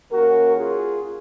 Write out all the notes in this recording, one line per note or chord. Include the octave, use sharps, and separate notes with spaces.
D#3 A#3 C#4 F#4 A#4
F4 G#4